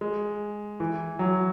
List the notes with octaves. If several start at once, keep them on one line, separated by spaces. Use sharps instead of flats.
G#3
E3
F#3